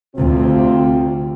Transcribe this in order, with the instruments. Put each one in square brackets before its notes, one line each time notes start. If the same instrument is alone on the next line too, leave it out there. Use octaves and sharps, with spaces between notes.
[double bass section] D2 [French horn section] C3 C4 F4